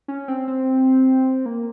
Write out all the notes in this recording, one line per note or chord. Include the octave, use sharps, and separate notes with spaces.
C#4
C4
C4
A#3